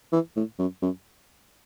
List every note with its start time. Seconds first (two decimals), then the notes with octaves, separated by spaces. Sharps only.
0.12 E3
0.36 A2
0.59 F#2
0.82 F#2